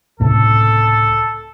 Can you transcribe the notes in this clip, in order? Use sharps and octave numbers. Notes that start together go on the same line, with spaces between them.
C#2 A2 C3 A4